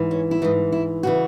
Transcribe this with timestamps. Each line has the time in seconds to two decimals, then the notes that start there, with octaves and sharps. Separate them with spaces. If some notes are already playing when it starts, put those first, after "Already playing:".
Already playing: G#2 E3
0.11 C#4
0.31 E4
0.42 G#2 E3 D#4
0.72 E4
1.03 C#3 E3 F#4